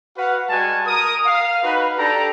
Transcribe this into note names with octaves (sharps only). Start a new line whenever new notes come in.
F#4 B4 F5 F#5
G3 G#3 F#4 G#5 A5
A#4 D#6
F5
D#4 F#4 B4
D4 G4 A4 A#5